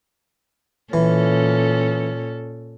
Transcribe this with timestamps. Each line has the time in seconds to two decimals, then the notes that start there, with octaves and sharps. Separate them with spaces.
0.93 A#2 E3 C#4 A4